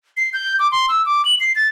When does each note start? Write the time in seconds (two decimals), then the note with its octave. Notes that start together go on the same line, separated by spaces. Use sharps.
0.17 C7
0.33 G6
0.59 D6
0.72 C6
0.89 E6
1.06 D6
1.25 F#7
1.40 C7
1.55 A6